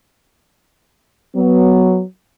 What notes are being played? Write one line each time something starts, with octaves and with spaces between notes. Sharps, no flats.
F#3 B3